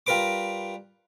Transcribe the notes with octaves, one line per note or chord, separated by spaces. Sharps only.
G3 F4 A#4 B4 B5 D6